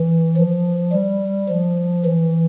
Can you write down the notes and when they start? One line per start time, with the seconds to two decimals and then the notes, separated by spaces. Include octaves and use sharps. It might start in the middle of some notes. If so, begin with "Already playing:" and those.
Already playing: E3
0.37 F3
0.92 G3
1.49 F3
2.05 E3